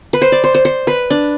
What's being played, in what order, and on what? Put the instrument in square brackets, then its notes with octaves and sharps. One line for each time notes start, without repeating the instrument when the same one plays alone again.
[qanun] B4
C5
D5
C5
C5
C5
B4
D4